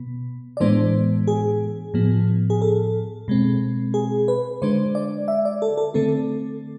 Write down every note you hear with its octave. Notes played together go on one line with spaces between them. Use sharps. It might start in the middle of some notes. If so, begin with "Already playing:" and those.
Already playing: B2 B3
D5
A2 E3 G#3 B3 D4 C5
G#4
A2 F3 B3
G#4
A4
B2 G#3 C4
G#4
B4
D3 G#3 D4 C5
D5
E5
D5
A4
A4
D3 A3 C4 A4